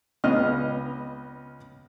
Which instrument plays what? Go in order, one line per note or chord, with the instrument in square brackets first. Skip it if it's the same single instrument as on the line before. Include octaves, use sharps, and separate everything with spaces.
[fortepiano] C#2 B3 D#5 F6